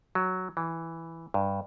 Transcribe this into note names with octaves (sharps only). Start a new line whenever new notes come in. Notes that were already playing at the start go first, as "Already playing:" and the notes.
F#3
E3
G2